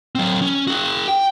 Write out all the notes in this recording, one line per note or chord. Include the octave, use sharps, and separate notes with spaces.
F#3 C4
C#4
F#4 G#4
G5